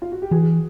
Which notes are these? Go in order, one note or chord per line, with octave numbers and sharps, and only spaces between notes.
F4
F#4
G4
E3 F#4 G#4